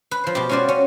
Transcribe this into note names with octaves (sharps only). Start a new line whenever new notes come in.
B4
F3 C5
B2 G4
C#4 F4 F#4 C5 D5
C#4